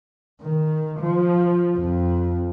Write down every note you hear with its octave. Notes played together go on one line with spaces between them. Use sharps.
D#3
F3
F2